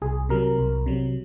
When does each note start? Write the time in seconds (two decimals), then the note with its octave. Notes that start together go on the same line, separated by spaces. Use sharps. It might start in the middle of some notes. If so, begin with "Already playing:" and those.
0.02 C2 G#4
0.29 C3 F#3 A#4
0.58 C2
0.86 C3 F#3